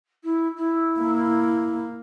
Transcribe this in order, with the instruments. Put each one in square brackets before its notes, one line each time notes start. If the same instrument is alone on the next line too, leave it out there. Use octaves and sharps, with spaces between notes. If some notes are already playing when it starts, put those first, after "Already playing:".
[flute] E4
E4
[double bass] A#3